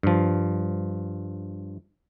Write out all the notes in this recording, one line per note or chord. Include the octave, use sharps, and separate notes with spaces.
G2 F3